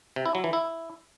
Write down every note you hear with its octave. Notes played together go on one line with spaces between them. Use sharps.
C3
E4
F#3
E3
E4